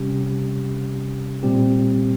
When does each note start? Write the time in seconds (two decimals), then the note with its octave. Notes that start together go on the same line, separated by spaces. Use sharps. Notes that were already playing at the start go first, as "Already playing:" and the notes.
Already playing: C3 G3 C#4 G4
1.43 A#2 G3 C4 G4